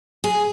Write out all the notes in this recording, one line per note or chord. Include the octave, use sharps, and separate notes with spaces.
G#4